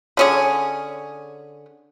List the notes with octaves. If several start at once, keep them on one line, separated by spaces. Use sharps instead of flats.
D3 C#4 G#4